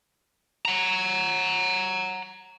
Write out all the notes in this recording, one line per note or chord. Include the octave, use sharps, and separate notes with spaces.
F#5 A#5